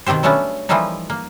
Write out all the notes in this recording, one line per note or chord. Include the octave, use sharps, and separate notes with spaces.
B2 D#3 C4 G4 C5
F#3 G3 A3 B3 C#4 D4
E3 F3 G3 A3 A#3 D#4
A#3